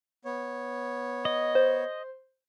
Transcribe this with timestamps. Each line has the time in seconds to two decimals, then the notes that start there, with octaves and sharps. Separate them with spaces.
0.25 B3 C#5
1.25 D#5
1.55 C5